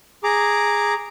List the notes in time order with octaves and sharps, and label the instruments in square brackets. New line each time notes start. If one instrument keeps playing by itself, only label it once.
[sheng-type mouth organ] G#4 A#5 D6